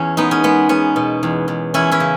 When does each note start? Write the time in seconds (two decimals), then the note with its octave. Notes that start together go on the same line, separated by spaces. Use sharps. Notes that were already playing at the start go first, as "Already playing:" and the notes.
Already playing: E2 C#4
0.17 G#3 B3 D#4
0.31 C#4
0.44 G#3 B3
0.69 B3 C#4
0.96 B2
1.23 E2
1.48 E2
1.74 E2 C#4 E4
1.92 C#4 E4
2.00 C#3